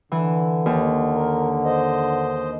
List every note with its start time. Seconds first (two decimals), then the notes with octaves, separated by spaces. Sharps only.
0.12 D3 E3
0.66 D#2
1.13 A#4
1.64 C5 D#5